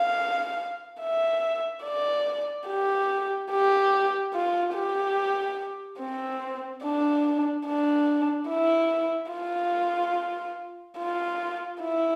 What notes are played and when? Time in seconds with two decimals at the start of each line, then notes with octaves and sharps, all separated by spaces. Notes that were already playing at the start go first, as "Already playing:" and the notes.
Already playing: F5
1.02 E5
1.84 D5
2.68 G4
3.51 G4
4.34 F4
4.75 G4
6.00 C4
6.83 D4
7.66 D4
8.48 E4
9.32 F4
10.98 F4
11.81 E4